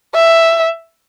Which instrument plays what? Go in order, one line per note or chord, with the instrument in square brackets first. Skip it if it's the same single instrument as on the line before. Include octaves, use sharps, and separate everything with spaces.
[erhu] E5